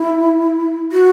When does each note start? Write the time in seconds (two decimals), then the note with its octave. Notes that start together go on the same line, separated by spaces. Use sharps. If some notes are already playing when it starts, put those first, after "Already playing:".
Already playing: E4
0.92 F#4